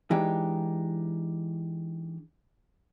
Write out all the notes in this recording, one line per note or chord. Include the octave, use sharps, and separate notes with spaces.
E3 G#3 D4 D#4 G4